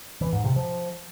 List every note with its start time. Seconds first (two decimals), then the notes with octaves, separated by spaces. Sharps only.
0.21 E3
0.33 G#2
0.44 C3
0.56 F3